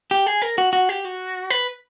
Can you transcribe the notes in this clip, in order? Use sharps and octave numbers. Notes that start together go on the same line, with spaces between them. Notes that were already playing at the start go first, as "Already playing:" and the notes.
G4
G#4
A#4
F#4
F#4
G4
F#4
B4